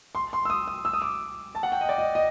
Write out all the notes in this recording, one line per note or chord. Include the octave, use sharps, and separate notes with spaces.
C6
C6
E6
D#6
D#6
E6
D#6
D6
A5
F#5
G5
D#5
D5
D#5
D#5